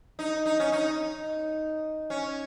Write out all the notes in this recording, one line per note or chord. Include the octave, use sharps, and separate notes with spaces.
D#4
D#4
C#4
D#4
C#4